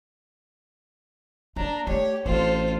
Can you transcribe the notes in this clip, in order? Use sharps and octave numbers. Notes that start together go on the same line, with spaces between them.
A#3 D4 A#5
A3 G4 C#5
A1 C4 F4 A4 C5